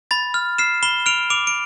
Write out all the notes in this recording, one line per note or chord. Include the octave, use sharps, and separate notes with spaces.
B5 A6
F6
F6 C7 E7
B5 E7 G7
F6 D7 F7
D6 D7 F7
D7